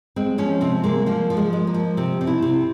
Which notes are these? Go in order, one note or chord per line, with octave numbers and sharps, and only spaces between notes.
G#3 C4
F3 C#4
C3 C4
G#3 A#3
F3 A#3
F3
G#3
G#3
A#3
F3
C3 C4
C3
E4
C3